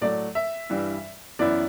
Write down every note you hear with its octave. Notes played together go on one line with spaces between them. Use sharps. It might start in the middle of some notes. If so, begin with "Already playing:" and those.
A2 F#3 A3 D5
E5
G2 E3 G3
F#2 E3 B3 E4 D5